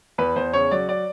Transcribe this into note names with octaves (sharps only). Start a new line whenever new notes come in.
E2 B4
E2 C5
C#3 C#5
F#3 D5
D5